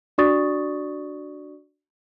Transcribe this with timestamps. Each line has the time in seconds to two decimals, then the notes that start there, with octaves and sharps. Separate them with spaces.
0.18 D4 F#4 D5 C#6 D#6 A6